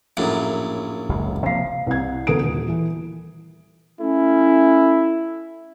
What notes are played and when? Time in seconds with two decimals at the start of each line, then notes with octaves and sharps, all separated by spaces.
0.17 A#1 F#2 A2
1.09 F#1 C#2
1.46 C3 F3 A#3 F5 C7
1.87 C2 G#6
2.27 D2 B3 A4 A#4 D#6 D7
2.42 D#1
2.68 E3
4.00 A3 C#4 E4